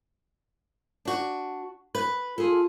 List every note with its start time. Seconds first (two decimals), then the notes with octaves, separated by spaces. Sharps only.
1.05 D4 F#4
1.95 B4
2.38 F4 G#4 A4